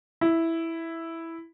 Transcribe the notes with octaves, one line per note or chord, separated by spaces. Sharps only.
E4